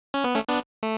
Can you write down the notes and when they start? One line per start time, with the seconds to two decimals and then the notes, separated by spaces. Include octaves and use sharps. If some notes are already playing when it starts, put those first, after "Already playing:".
0.14 C#4
0.24 B3
0.34 A3 C#4
0.48 B3 D4
0.83 A3